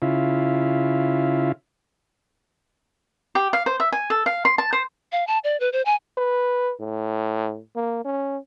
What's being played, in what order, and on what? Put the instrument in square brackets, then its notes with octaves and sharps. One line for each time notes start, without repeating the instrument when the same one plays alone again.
[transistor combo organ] C#3 E4 F4
[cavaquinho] G4
F5
C5
E5
G#5
A4
F5
C6
A5
C5
[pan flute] F5
A5
D5
B4
C5
G#5
[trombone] B4
A2
A#3
C#4